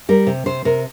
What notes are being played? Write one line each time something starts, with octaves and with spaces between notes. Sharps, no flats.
G3 A#4
C3
C3 C5
C3 A#4